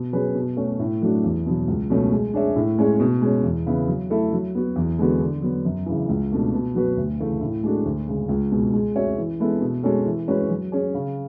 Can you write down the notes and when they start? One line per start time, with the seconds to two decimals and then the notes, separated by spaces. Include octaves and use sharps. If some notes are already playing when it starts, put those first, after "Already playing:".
Already playing: B2
0.13 F#3 C#4 G#4 B4
0.35 B2
0.57 A3 C#4 F#4
0.79 A2
1.02 F#3 A3 D4 F#4
1.24 E2
1.46 B2 F#3
1.68 C#2
1.90 B2 F#3 A3 C#4
2.12 G#3
2.34 D4 G#4 C#5 E5
2.56 A2
2.79 G#3 C#4 G#4 C#5
3.00 B2
3.22 G#3 C#4
3.44 E2
3.66 C#3 E3 B3 E4
3.88 F#3
4.10 A3 E4 A4
4.33 F#3
4.55 B3 F#4
4.76 E2
4.99 D3 G#3 B3 F#4
5.21 D3
5.42 F#3 B3
5.65 F#2
5.86 C#3 E3
6.09 C#2
6.31 B2 A3 D4
6.53 B2
6.75 F#3 B3 F#4 B4
6.97 D2
7.20 C#3 E3 A3
7.41 A2
7.64 G#3 D4 F#4 A4
7.85 D2
8.08 C#3 G#3
8.29 C#2
8.52 B2 G#3
8.73 G#3
8.96 C#4 F#4 C#5 E5
9.18 E3
9.40 G#3 B3 E4 A4
9.61 B2
9.83 G#3 C#4 F#4 A4
10.06 E3
10.28 G#3 C#4 F#4 B4
10.50 F#3
10.72 C#4 G#4
10.94 C#3